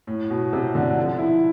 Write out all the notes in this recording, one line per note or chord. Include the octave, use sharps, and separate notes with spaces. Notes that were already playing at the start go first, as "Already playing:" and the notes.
A2
B2
C3
D3
F3
E4